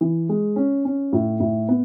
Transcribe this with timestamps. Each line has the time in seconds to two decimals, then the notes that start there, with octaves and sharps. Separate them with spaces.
0.01 E3
0.29 G#3
0.56 C#4
0.85 C#4
1.13 A2
1.40 A2
1.69 B3